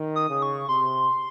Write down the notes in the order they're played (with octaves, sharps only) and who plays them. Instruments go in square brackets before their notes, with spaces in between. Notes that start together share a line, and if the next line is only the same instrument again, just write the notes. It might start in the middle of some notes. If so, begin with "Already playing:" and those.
Already playing: [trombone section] D#3
[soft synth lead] D#6
[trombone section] C#3
[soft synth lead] C#6
[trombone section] C3 [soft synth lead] C6